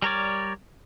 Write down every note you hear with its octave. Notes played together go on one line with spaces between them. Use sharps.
G3 A#4 C#5 D5